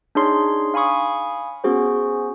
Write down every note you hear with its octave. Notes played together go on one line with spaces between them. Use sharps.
D4 D#4 G#4 C#5 C6
F5 G#5 B5 C#6 D#6
B3 C#4 F#4 G#4 C5